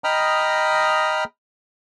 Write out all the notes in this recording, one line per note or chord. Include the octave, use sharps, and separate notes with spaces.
D#5 G5 A#5 B5 D#6 F6